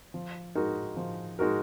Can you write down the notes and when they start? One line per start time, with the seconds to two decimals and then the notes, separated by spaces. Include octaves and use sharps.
0.14 F3
0.55 G#3 D#4 F#4 A#4
0.97 F3
1.39 G#3 D#4 F#4 A#4